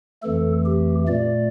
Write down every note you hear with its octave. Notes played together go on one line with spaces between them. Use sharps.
F2 E3 A3 A4
G4
A#2 A3 D5